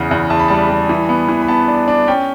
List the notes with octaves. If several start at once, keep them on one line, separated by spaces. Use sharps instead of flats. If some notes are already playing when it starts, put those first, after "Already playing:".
Already playing: E2 C#3 F#5
E2
E2 A5
B5
G3 A5
G3
E3
B3
E3
B5
B3 A5
D4
D4
C#4 G5